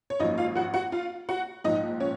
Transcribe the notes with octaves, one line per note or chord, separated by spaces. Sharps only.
C#5
G#1 F#2 F3 A#3 D#4 D#5
F4 F5
F#4 F#5
F#4 F#5
F4 F5
F#4 F#5
A#1 G#2 F3 D#4 D#5
C#4 C#5